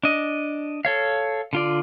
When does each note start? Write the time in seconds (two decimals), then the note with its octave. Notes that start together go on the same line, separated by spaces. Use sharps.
0.03 D4 D#5
0.85 A4 C#5 F5
1.53 D3 F4 D5